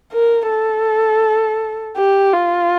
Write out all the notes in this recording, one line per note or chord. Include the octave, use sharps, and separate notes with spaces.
A#4
A4
G4
F4